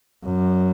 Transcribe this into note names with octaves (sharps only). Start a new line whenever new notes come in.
F#2